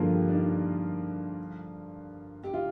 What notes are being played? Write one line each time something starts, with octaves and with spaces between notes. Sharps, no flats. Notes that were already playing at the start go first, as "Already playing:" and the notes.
Already playing: G2 D3 F3 A#3 F4 G#4 A#4
G4
D4
D#4
G4
F4